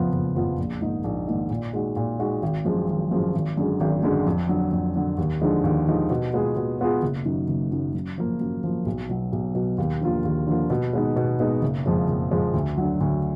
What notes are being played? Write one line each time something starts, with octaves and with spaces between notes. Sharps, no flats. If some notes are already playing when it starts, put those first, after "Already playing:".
Already playing: F#1 F2 F3 B3 F4
F#1
F2 F3 B3 F4
A#1
G#2 D#3 A#3 D#4
A#1
G#2 D#3 A#3 D#4
A#2
G#3 D#4 F#4
A#2
G#3 D#4 F#4
G#1
F#2 F3 G#3
G#1
F#2 F3 G#3
G#1
F#2 D3 G#3
G#1
F#2 D3 G#3
F2
D3 F#3
F2
D3 F#3
D#2
D3 F3 G#3 D#4
D#2
D3 F3 G#3 D#4
B2
G#3 B3 F4 G#4
B2
G#3 B3 F4 G#4
F#1
F#2 D#3
F#1
F#2 D#3
F#2
F3 A#3
F#2
F3 A#3
B1
B2 F#3
B1
B2 F#3
D#2
D3 F3 A#3 F4
D#2
D3 F3 A#3 F4
B2
G#3 B3 D#4
B2
G#3 B3 D#4
F#1
F2 F3 G#3
F#1
F2 F3 G#3
D2
D3 F#3
D2